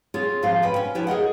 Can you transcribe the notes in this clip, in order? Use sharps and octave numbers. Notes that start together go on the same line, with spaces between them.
C4 F4 G#4 C#5
D#2 G#2 F3 F4 C5 F5
F#2 B2 B4 G5
C#4
F3 E4 B4 C#5 G5
G#4 A#4 D#5 F#5